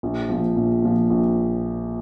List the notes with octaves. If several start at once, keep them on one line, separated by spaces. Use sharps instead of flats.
A#1
A#2 F3
A#1
A#2 F3
A#1